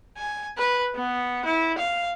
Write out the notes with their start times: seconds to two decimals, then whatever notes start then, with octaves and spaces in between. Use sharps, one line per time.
0.17 G#5
0.58 B4
0.95 B3
1.45 E4
1.78 F5